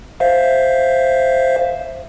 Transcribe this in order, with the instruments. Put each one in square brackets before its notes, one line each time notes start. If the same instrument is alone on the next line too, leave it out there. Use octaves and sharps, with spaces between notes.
[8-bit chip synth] C5 E5 F5